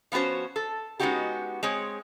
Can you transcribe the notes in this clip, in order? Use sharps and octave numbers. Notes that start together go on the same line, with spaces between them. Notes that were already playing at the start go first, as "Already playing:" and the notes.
F3 B3 C#4 F#4 C5
A4
G#3 B3 C#4 D#4 F#4 G4
G#3 C4 G#4 C#5